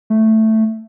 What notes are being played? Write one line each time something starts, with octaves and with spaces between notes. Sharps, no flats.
A3